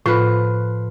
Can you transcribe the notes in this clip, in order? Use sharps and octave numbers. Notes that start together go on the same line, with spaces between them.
A2 F3 B4